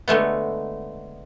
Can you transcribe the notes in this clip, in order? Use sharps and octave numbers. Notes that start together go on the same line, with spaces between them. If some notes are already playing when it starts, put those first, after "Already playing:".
D3 G#3 A3 B3